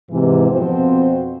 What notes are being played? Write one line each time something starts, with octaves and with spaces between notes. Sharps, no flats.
G#2 C3 E3
F2 B2 F3 C4 F#4 C5